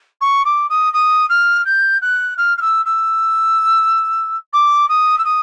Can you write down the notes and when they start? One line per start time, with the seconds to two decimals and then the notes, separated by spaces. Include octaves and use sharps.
0.21 C#6
0.45 D6
0.70 D#6
0.93 D#6
1.29 F6
1.65 G6
2.02 F#6
2.37 F6
2.58 F6
2.61 E6
2.86 E6
4.53 D6
4.89 D#6
5.18 E6
5.25 D#6